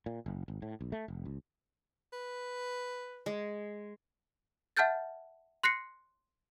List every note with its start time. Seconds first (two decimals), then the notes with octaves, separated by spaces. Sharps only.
0.06 A#2
0.26 F#1
0.48 G#1
0.62 A2
0.81 B1
0.92 A3
1.08 F1
1.25 C#2
2.13 B4
3.26 G#3
4.77 E5 F#5 A5 F6 G6 A6
5.63 C6 F#6 A#6 C7 C#7